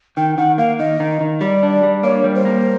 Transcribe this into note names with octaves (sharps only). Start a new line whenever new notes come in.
D#3 G5
D#3 F#5
A#3 F5
D#3 D#5
D#3
D#3
G3 D5
D4
G3
A#3 C#5
G3
C5
A#3